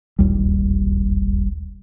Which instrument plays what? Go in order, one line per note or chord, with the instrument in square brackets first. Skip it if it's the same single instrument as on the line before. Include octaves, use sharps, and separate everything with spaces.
[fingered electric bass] E1 A#1 D#2 G3